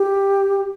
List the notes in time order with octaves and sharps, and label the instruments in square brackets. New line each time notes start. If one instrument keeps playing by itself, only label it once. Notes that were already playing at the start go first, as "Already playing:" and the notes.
Already playing: [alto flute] G4